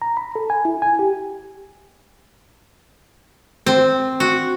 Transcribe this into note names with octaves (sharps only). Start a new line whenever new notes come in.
A#5
B5
A4
G#5
E4
G#5
G4
C4
F#4